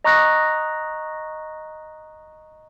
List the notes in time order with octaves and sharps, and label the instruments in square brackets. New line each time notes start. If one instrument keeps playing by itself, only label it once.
[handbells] D#5 A#5 C#6 D#6 F#6 A#6